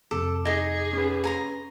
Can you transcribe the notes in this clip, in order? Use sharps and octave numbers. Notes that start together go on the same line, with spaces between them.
F2 C3 A4 D6
D#4 G#4 D#5 G#5
C#4 B4
G#5 A#5 C6